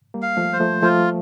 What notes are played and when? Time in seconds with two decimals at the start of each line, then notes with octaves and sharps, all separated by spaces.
0.14 G3 A#3
0.22 F5
0.37 F3 A3
0.53 C5
0.60 F3 A3
0.82 F3 A3 F4